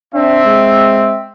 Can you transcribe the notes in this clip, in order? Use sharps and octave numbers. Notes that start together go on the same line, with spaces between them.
C4 D4 E5
G#3